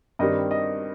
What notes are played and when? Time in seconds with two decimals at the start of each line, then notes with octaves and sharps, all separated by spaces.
0.19 G2 D#3 G3 C4 D#5
0.51 D#5